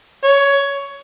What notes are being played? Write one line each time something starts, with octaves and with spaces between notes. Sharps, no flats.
C#5